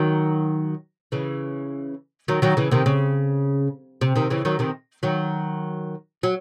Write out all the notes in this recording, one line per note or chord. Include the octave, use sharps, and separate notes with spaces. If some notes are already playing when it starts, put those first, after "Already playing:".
Already playing: D#3 F#3
C#3 E3
D#3 F#3
D#3 F#3
C#3 E3
C3 D#3
C#3
C3
C3 D#3
C#3 E3
D#3 F#3
C3 D#3
D#3 F#3
F#3